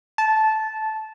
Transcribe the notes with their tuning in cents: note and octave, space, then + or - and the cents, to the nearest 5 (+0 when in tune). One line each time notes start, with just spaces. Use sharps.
A5 -10